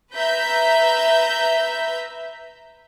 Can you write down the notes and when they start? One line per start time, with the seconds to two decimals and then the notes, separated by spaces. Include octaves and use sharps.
0.15 B4 E5 A#5 G6 B6